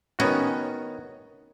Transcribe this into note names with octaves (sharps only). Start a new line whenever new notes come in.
D#3 B3 C#4 F#4